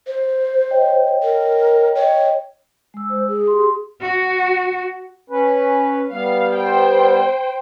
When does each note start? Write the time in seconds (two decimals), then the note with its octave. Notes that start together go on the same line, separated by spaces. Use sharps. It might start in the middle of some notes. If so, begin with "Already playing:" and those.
0.07 C5
0.70 C#5 D#5 G5
1.23 A#4
1.96 C#5 D#5 G5
2.94 G#3 E6
3.10 C5
3.28 G#4
3.48 G4 C6
4.01 F#4
5.30 C#4 B4
6.12 G3 B3 F5
6.54 C5 G5